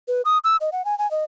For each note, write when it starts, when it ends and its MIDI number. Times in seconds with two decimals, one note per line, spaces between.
0.08 0.22 71
0.25 0.38 87
0.44 0.57 88
0.61 0.70 75
0.72 0.84 78
0.85 0.97 80
0.98 1.09 80
1.11 1.24 75